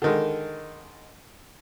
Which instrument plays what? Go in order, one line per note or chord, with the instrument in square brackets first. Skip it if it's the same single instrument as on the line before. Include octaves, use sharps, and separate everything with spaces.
[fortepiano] D3 D#3 G#3